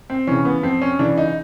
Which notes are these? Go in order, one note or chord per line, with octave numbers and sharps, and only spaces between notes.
C4
C#3 E3 C#4
B3
F2 C4
C#4
C#3 E3 D4
D#4